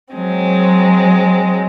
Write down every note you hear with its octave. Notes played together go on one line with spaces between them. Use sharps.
F#3 G#3 C4